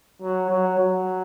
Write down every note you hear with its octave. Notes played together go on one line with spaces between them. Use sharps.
F#3
F#3
F#3